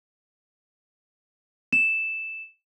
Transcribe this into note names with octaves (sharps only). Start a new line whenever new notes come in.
E7